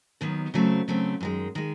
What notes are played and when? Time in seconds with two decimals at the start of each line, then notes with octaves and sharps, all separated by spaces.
0.21 D#2 D#3 F#3 B3
0.54 C#3 F#3 A3 C4
0.88 C#3 F#3 A3 C4
1.21 F#2 D#3 G#3
1.55 D#3 G#3